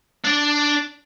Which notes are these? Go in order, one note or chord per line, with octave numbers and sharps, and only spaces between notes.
D4 D5